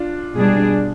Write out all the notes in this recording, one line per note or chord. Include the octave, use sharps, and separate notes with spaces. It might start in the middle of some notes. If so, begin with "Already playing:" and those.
Already playing: D4 F4
B2 G3 D4 G#4